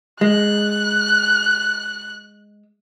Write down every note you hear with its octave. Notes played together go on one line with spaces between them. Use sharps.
G#3 F#6